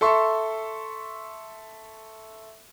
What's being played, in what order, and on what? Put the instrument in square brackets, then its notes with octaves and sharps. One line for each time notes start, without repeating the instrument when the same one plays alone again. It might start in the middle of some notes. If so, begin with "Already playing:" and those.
[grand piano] A4 E5 C6 C#6